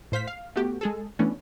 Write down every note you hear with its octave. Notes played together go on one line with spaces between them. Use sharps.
A2 C5 F5 B6
F5
A3 B3 F#4 G4
G#3 G#4 A4
E3 A3 B3 C#4 D4